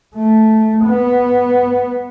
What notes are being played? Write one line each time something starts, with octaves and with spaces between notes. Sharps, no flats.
A3
B3